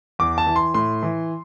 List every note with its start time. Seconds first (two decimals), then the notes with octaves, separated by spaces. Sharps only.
0.19 E2 D6
0.38 A5
0.47 E3
0.56 C6
0.74 A2 C6
1.03 E3